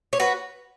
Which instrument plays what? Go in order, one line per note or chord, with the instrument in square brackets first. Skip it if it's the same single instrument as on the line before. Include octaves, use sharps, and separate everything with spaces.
[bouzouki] C#5
F#4 B4